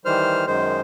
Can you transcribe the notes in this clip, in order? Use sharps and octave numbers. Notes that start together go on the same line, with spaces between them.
D#3 E3 G3 C5 F6
F#2 D#3 G#3 C5